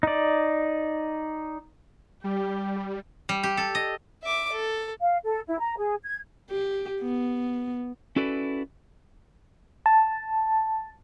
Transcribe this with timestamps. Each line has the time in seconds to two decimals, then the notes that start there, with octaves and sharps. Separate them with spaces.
0.03 D#4 D5
2.24 G3 G4
3.29 G3
3.43 G4
3.57 A4
3.75 D#5
4.23 E5 D6
4.52 A4
5.00 F5
5.24 A4
5.47 E4
5.60 A#5
5.78 G#4
6.03 G#6
6.51 G4
7.02 B3
8.16 C#4 E4 F#4 A4 B4 D5
9.86 A5